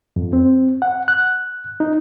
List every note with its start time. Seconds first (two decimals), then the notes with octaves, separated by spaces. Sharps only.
0.16 F2
0.33 C4
0.82 F#5
1.08 F#6
1.80 D#4